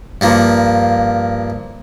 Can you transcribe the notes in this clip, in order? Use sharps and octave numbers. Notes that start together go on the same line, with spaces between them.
G2 F3 A#3